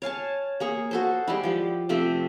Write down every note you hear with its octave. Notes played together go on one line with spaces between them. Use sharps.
C#5 F5 G#5 A5
A#3 G#4 C#6
F#4 A4 C5
G3 G#3 E4
F3 G4
C3 F3 A3 E5